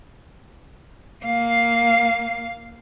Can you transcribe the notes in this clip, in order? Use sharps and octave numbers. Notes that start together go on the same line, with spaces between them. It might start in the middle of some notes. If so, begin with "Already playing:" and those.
A#3 F5